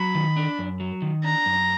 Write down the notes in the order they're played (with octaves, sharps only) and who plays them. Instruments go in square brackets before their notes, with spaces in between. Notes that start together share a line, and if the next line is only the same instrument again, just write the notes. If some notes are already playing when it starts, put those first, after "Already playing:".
Already playing: [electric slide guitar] F#3 [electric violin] B5
[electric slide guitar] D#3
D4
F#2
F#3
D#3
[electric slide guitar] D4 [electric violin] A#5
[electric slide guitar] F#2